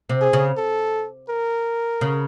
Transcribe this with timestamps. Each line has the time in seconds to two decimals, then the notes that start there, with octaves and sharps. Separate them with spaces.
0.09 C3
0.21 G#4
0.33 C#3
0.57 A4
1.29 A#4
2.01 C#3